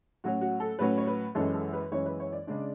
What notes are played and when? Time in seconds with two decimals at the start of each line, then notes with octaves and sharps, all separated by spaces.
0.24 A2 F#3 C#4 F#4
0.41 F#4
0.60 A4
0.79 A2 F#3 C#4 B4
0.98 C#5
1.07 B4
1.35 F#2 E3 G#3 C#4 A4
1.54 A4
1.73 B4
1.92 F#2 E3 G#3 C#4 C#5
2.06 B4
2.20 C#5
2.33 D5
2.47 C#3 G#3 D4 D5